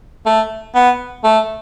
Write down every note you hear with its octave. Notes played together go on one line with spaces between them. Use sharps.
A3
B3
A3